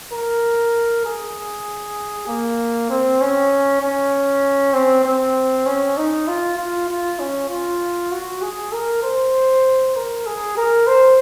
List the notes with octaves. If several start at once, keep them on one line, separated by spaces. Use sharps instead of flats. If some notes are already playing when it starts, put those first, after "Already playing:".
A#4
G#4
A#3
C4
C#4
C#4
C4
C4
C#4
D#4
F4
F4
F4
C#4
F4
F#4
G#4
A#4
C5
A#4
G#4
A#4
C5